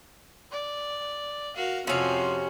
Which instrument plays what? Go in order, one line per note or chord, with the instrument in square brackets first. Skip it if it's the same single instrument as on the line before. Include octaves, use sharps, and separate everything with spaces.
[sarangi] D5
[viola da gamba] F#4 A#4 [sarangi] F5
[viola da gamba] F2 C4 F#4 [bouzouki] C3 C#4 [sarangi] F3